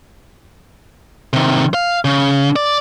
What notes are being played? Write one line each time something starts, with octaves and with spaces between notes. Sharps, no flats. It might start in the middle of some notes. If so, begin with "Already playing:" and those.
C3 D#3
F5
C#3
D5